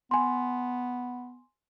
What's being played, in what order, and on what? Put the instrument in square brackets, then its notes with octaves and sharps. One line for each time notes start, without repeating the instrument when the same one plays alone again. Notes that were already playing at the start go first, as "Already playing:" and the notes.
[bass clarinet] B3 [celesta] G#5 C6